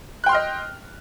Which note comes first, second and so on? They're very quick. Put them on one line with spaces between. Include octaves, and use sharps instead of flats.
F#6 G5 C6 F6 D#5